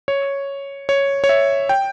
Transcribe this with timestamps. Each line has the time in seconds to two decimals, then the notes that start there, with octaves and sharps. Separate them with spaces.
0.08 C#5
0.89 C#5
1.24 C#5
1.29 E5
1.69 G5